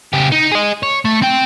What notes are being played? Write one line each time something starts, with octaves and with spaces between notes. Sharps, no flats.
C#3 G4
D#4
G#4 D#5
C#5
A3
C4 G5